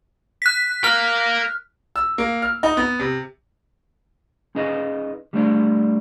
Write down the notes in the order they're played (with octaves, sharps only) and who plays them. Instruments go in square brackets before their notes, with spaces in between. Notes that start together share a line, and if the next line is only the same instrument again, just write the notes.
[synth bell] F#6 B6
[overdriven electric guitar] A#4 F5 [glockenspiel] F6
[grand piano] E6
A#3
F6
D#4
B3
C3
[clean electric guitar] C#4 D#4 G#4 B4 D#5
G3 A3 D4 C5 D5